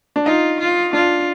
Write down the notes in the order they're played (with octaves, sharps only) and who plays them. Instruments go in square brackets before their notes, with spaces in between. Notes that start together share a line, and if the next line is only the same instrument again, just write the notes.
[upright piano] D4
[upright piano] D#4 [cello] F4
[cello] F4
[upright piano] D4 [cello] F4